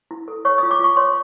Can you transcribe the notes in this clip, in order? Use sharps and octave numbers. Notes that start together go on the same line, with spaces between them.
E4
A4
C#5 C#6
D#6
F4
D6
F4 C#6
C#5 C6